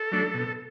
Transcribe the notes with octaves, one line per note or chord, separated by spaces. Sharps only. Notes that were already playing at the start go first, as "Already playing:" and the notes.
Already playing: A4
F#3 A3 D4
B2